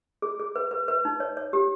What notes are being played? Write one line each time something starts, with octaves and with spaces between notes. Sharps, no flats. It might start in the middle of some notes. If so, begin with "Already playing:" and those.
G#4
G#4
B4
B4
B4
D#4
C#5
C#5
G4